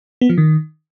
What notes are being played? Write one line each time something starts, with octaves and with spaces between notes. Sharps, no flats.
B3
F3
D#3